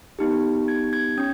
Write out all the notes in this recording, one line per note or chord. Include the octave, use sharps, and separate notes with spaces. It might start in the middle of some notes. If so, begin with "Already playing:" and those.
B3 D#4 G4
G#6
G#6
C#4 G#6